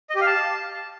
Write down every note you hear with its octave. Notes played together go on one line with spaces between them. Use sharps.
D#5
G4
F5
A5